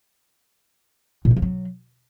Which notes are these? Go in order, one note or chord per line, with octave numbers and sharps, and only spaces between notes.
A#2
G#3
F3
F#3